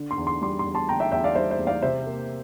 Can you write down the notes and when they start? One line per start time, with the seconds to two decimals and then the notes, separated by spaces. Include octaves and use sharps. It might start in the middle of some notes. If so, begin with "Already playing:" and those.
Already playing: D3
0.11 C6
0.18 E2
0.27 C6
0.42 G3 C6
0.59 C6
0.65 E2
0.75 A5 C6
0.89 D3 G5 A#5
1.00 E5 G5
1.11 E2 E5 G5
1.24 D5 F5
1.35 G3 C5 E5
1.51 C5 E5
1.59 E2
1.67 D5 F5
1.82 C3 C5 E5
2.06 A#3